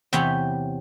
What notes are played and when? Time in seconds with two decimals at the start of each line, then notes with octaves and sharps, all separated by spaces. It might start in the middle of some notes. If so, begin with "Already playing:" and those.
0.13 E2 C3 G4 C#5 B5